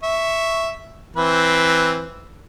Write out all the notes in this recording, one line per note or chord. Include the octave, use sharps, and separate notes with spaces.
E5 C#6
E3 C4 B4